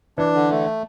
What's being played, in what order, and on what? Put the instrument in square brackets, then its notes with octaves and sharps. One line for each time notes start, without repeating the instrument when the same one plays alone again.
[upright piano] E3 [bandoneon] D4
[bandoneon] D3
A3